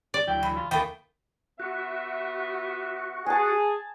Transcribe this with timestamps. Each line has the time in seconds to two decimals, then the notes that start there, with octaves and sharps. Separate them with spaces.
0.14 D5
0.27 D2 F#3 E4 G5
0.43 E3
0.56 F4
0.71 D#2 E3 A3 A#3 G5 A5 D#6
1.60 B3 F#4 E5
3.26 G#4 G#5 A5